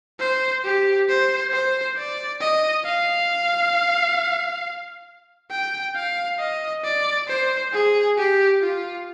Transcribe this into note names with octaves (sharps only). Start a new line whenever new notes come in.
C5
G4
C5
C5
D5
D#5
F5
G5
F5
D#5
D5
C5
G#4
G4
F4